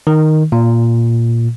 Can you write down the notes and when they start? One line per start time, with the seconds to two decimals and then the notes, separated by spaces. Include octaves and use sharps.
0.07 D#3
0.52 A#2